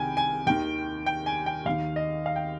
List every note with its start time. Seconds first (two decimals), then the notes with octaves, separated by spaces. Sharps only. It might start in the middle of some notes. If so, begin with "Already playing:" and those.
Already playing: C2 C3 D#3 G5 G#5
0.17 G#5
0.47 D#2 D#3 G5
1.06 G5
1.26 G#5
1.46 G5
1.66 D#2 D#3 F5
1.96 D#5
2.26 F5
2.36 G5